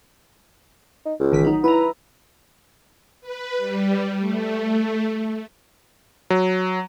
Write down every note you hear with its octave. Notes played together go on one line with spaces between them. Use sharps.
D#4
C#2
A1 D#3 B6
F#3 D#4
E4 B4 A#5
B4
G3
A3
F#3